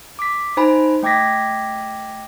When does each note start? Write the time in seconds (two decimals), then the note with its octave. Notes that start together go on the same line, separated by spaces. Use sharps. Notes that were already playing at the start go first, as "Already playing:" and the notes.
0.19 D6 B6
0.57 D#4 C5 G#5 A#5 B5
1.03 A3 G5 D6 G#6 A#6 B6